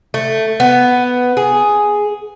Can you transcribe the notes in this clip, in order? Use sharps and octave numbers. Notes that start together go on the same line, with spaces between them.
A3
B3
G#4